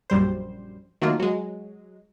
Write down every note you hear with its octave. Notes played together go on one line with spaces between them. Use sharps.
A#1 F#2 G3 C5
D#3 F#3 A3 A#3 F4
F#3 G#3